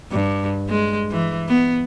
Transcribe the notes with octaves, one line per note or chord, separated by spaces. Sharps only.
G2
G#3
E3
B3